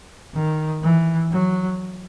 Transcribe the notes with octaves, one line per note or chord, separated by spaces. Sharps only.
D#3
E3
F#3